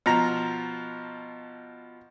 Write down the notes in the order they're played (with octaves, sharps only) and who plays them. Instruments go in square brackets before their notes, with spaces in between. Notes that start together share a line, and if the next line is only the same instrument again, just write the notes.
[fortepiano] B2 F3 A#5